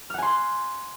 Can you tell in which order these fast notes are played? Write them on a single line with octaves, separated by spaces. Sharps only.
F6 F#5 G#5 C6